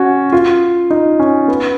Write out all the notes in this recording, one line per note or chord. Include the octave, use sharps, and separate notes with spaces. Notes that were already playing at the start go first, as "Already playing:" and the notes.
Already playing: C#4 F#4
F4
D#4
C#4
B3